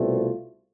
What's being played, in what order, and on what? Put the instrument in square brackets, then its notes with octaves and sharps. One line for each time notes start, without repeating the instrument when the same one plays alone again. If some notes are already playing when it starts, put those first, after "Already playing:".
Already playing: [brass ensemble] C2 B2 A3 C4 F4